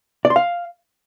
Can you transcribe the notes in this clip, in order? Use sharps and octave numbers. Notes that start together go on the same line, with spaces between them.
D5
C6
F5